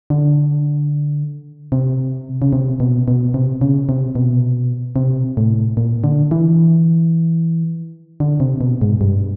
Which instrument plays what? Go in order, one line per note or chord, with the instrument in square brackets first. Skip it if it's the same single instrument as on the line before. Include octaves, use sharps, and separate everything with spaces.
[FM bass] D3
C3
C#3
C3
B2
B2
C3
C#3
C3
B2
C3
A2
A#2
D3
E3
D3
C3
B2
G#2
G2